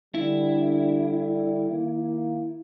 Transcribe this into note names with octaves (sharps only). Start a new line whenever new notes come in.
D3 G3 E4
D#3 A#3